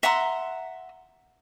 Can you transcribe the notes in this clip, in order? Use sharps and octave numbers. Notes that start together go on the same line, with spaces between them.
E5 F#5 A#5 C6